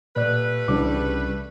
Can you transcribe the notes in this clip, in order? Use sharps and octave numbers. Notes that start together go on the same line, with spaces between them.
A#2 G3 A3 B4 D5 F#6
C2 C#3 E3 D4 D6